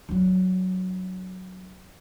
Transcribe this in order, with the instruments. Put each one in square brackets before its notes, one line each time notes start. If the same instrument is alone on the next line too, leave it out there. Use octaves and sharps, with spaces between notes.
[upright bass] F#3 D4